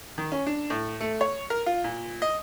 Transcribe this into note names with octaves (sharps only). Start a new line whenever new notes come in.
D#3
C#4
D4
A2
A3
C#5
A#4
F4
A#2
D#5